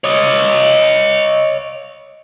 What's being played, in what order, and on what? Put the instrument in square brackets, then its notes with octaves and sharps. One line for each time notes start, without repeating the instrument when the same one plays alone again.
[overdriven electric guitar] C#5 D#5